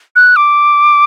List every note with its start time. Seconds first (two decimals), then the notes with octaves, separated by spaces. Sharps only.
0.16 F#6
0.36 D6